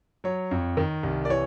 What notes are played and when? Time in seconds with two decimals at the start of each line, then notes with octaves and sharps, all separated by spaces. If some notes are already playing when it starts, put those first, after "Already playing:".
0.24 F#3 C#5
0.51 F2
0.77 D#3
1.03 C2
1.25 D5
1.29 E3 C#5